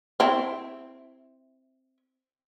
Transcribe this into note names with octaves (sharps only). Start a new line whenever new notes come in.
C4 E4